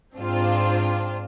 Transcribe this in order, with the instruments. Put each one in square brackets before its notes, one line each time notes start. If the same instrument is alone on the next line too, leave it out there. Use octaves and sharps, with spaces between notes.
[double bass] G#2 [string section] C4 D4 F4